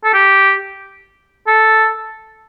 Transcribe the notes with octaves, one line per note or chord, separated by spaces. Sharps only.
A4
G4
A4